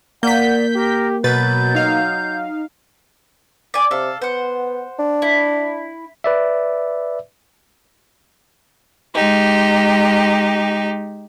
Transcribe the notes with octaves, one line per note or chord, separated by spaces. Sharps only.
A#3 D5 F#5 G6 B6
G4 A#4
B2 F#3 B4 G6 A6
D#4 F5
D5 G#5
C3 A4 F5
B3 C5 F#5
D4
E4
B4 D5 E5
G#3 D#4 G4